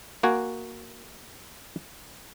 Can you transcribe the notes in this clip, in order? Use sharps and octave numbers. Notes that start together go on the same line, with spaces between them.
A#3 F#4 G#5